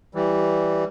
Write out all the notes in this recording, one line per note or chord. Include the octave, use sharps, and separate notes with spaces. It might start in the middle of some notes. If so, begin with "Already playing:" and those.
E3 G3